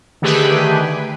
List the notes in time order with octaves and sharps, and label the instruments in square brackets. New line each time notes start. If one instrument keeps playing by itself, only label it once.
[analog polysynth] D3 D#3 A3 G4 G#4 B4